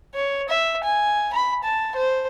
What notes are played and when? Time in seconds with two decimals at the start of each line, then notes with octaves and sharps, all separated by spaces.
0.15 C#5
0.49 E5
0.84 G#5
1.33 B5
1.64 A5
1.96 C5